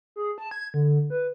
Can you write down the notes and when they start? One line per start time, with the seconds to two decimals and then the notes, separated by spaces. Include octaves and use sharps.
0.16 G#4
0.38 A5
0.51 G#6
0.74 D3
1.10 B4